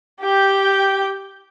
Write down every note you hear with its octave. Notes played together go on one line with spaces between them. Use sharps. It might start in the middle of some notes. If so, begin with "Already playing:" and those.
G4 G5